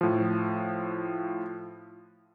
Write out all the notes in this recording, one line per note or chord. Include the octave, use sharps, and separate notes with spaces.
A2 F3